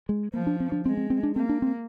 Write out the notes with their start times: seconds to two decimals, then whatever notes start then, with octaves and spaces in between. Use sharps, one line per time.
0.09 G#3
0.34 F3 A#3
0.47 D4
0.60 C4
0.72 D4
0.86 G#3 C4
0.97 C4
1.10 C4
1.23 D4
1.36 A#3 C4
1.49 D4
1.62 C4